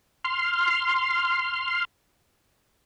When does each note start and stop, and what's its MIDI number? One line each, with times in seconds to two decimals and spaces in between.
0.24 1.85 84
0.24 1.85 89